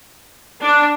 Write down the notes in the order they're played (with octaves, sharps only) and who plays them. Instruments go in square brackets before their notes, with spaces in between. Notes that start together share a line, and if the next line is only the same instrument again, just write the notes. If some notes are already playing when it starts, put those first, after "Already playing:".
[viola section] D4